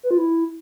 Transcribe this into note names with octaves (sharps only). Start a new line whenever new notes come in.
B4
F4
E4